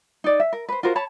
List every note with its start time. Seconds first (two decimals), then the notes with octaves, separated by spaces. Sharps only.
0.24 D#4 D5
0.40 E5
0.53 A#4
0.69 B4 C5
0.83 F4 F#4 A#4 C5
0.95 C#5 A5 B5